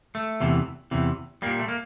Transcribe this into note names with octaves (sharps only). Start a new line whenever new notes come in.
A3
E2 C3 E3
E2 C3 E3
A#2 G3 A#3
A3
A#3